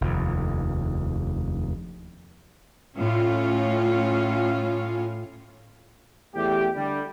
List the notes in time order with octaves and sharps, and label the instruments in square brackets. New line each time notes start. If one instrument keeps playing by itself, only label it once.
[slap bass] F1 D#2
[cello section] A2 C#4 F4
[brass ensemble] E2 A3 G4
D3 G3